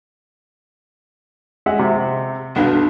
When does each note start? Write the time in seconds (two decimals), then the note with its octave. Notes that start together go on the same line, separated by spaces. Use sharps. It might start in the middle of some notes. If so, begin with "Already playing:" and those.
1.66 G#3 E5 F#5
1.79 C3
2.56 B1 D4 B4 F5